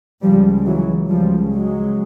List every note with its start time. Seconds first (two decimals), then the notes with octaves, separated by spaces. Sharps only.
0.22 C#2 C#3 F3 G3
0.65 E3 F#3
1.09 C#2 C#3 F3 G3
1.53 F#3 G#3